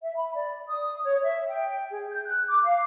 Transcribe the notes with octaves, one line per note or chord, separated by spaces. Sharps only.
E5
B5
D5
D#6
C#5
E5
G5
G#4
G6
F#6
D6
F5